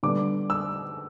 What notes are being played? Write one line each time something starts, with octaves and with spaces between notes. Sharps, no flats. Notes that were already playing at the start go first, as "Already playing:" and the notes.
D3 G3 B3 D4 D6
E6